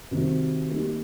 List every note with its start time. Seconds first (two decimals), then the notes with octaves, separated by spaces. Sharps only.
0.11 C3 D#3 G3 C4 F#4
0.69 G3 A#3 D#4 G4